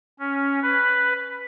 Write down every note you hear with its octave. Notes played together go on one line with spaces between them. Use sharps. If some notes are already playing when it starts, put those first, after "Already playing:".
C#4
B4